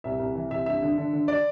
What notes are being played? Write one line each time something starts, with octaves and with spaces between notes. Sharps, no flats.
C2 E5
C2
E3
C2 E5
G2 E5
D3
D3
D3
D5